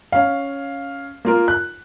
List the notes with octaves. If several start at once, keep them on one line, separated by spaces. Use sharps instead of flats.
C#4 F5
A#3 F4 A#4
F#6